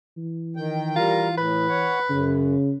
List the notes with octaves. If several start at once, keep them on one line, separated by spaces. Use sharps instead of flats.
E3
D#3 G5
G3 F4 A#4 A#5
A2 B4
C#5 F#5
F#2 C#3